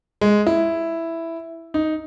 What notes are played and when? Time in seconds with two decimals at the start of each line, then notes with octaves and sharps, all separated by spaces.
0.21 G#3
0.47 E4
1.74 D#4